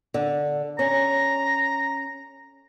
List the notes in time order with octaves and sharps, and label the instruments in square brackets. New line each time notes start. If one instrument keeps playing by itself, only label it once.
[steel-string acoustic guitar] D3
[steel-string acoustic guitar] C#4 [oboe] A#5